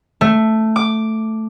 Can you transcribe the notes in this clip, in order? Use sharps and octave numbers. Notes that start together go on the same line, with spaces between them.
A3
D6